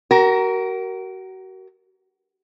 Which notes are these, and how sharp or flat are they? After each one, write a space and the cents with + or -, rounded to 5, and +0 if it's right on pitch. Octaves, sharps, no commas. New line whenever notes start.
F#4 +35 A#4 +0